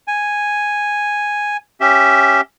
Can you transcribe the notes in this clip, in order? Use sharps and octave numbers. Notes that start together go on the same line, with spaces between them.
G#5
C#4 G4 E5